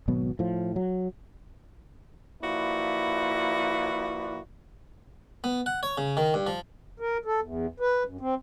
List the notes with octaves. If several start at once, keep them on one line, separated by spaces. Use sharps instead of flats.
G#1 B2 F#3 B3
A2 F3
F#3
F3 A#3 E4 F#4 B4 D5
B3
F#5
C#5
C#3
D#3
G2
F3
A#4
A4
E2
B4
F#2
C4